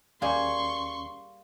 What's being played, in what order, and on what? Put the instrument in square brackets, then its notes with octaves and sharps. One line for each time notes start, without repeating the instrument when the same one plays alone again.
[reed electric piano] D#2 C#4 [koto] G3 A#3 G#4 [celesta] F5 [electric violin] C6 C#6